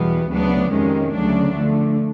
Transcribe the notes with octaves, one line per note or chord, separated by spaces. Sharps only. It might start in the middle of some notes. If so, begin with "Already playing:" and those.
Already playing: E2 B2 G3 B3
D2 C#3 F#3 B3 D4
F2 C3 D#3 G#3 C#4
D2 C#3 F#3 A3 D4
D3 F3 A3